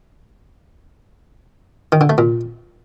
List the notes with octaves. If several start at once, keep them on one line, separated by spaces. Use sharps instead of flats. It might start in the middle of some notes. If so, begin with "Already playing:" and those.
D#3
D3
A3
A#2